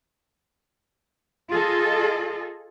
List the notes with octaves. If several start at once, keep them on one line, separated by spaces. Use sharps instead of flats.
F4 G#4 A4 D#5